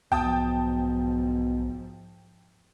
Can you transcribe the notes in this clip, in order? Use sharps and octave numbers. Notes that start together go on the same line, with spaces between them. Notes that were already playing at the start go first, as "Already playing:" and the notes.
B1 G#2 B2 F3 G5 A5 D#6